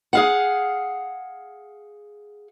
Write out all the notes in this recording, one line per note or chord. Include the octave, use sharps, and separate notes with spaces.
G#4 F5 F#5